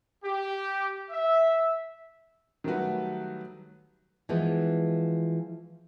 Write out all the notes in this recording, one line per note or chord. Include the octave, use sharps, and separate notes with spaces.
G4
E5
D#3 F#3 G3 A3 F#4 B4
E3 F3 G#3 B3